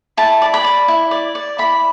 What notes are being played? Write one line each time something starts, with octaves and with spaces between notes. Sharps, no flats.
E4 A5
D5
B5
D5
E4
D5
D5
E4 B5